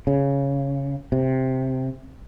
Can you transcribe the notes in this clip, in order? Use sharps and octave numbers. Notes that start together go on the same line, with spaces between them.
C#3
C3